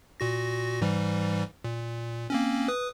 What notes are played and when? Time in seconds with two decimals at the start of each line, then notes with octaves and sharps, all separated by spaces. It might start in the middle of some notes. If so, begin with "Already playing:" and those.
0.20 A#2 F#4 A#6
0.81 G#2 E3 G3
1.64 A#2
2.30 A#3 C4 C#4
2.68 B4 D#6